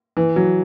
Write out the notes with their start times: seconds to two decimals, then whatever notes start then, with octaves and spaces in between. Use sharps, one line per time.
0.17 E3
0.36 F#3